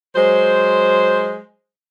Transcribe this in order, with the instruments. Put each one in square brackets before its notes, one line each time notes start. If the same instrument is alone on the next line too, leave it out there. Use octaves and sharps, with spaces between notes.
[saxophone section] F#3 G#3 C5